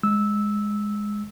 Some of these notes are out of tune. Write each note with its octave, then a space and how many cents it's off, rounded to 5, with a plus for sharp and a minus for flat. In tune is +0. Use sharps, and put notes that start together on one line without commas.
G#3 +0 E6 -10